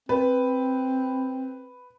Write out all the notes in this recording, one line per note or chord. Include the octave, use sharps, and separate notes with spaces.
C4 B4